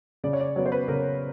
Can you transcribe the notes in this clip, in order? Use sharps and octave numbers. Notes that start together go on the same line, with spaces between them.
C#3 D5
C#5
D5
F#3 B3 C#5
C5
B4
C#3 A#4